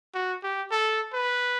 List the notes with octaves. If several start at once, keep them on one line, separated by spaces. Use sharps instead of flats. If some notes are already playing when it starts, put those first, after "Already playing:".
F#4
G4
A4
B4